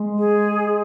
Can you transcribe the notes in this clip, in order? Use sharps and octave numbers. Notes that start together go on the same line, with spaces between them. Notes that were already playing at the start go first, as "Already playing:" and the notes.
Already playing: G#3
G#4